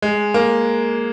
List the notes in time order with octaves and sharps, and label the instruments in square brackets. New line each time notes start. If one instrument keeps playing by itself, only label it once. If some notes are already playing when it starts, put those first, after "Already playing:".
[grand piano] G#3
A#3